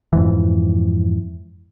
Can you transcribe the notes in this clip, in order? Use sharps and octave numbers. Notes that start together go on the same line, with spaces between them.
F2 G#2 E3